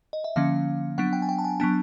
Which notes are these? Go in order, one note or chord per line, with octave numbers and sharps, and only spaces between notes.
D#5
E5
D3 F3 A#3 C#4 F5
F#3 B3 D4 F#5
G5
G#5
G5
A5
G#5
F#3 B3 D4 A5